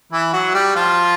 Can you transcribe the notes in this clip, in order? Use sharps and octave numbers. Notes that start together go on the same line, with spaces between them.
E3 E4
F#3 F#4
G3 G4
F3 F4